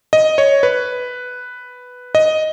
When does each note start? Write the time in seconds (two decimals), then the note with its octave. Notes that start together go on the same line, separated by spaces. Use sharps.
0.13 D#5
0.38 C#5
0.63 B4
2.15 D#5